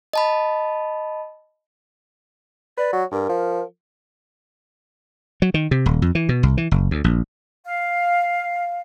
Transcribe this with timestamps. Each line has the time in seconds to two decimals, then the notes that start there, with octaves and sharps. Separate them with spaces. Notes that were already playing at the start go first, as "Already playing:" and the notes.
0.13 D#5 A5 B5
2.78 B4 D5
2.93 F#3
3.12 G2 A#4
3.29 F3
5.42 F#3
5.54 D#3
5.71 C3
5.86 D#1
6.02 F2
6.15 E3
6.29 B2
6.43 C2
6.57 E3
6.71 F#1
6.91 D2
7.04 A#1
7.65 F5